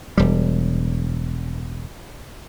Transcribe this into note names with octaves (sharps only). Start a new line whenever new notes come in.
E1 G3